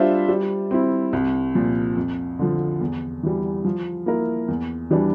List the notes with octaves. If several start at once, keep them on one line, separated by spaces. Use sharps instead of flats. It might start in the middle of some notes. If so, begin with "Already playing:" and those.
Already playing: G3 D4 F4 C5 E5
G3
C4 E4
C2
A#2 F3
F2
D3 F3
E2
E3 G3
F3
A#3 E4 A#4
E2
E3 G3 D4